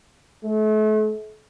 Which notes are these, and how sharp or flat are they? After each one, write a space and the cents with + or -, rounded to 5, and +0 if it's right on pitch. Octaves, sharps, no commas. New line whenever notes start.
A3 -40